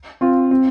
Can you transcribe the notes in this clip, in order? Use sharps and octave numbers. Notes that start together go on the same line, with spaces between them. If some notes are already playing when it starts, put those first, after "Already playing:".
C4 F4
C4